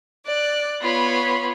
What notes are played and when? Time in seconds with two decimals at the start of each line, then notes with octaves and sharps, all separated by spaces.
0.24 D5 F#6
0.81 B3 F4 C#5 B5 C#6